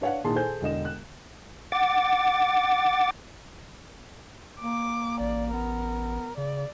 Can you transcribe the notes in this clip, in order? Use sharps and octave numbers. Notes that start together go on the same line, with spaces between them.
D4 B4 C#5 F5 F#5
A#2 D#3 E4 G#4 A5 C6
G#4 A4 C5 G#5 G6
E1 D3 D#5 E7
F#6
F#5 D6 A6
A#3 D6
A1 D5
B3 A#4
C#3 D5